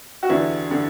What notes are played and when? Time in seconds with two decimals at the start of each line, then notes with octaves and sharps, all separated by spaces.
0.23 F#4
0.29 E2 D3 G3 D4 E4
0.70 D3 G3 D4